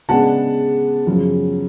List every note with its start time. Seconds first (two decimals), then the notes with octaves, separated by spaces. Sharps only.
0.09 C#3 G#3 B3 D4 F#5 A5
1.07 F#2 C#3 F3